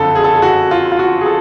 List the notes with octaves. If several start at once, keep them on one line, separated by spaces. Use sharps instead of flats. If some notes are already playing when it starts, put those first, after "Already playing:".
Already playing: F#1 F2 D3 A4
G#4
A4
G#4
F#4
F4
F4
F#4
G#4
A4